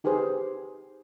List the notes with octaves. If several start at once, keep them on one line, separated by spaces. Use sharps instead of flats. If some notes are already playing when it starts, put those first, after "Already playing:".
D#4 G4 G#4 B4 C5